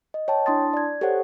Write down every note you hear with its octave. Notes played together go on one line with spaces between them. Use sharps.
D#5
C#5 G5 A5
D4 E4 A5 C6 D#6 A6
D5 G#6
G4 A4 C5 C#5 F#5